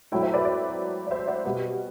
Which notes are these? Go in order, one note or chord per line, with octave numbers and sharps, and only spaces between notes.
F#3 A3 E4 E5 G5
C5 E5
B4 D5
B4 D5
D5
C5 E5
D5 F#5
B2 G3 B3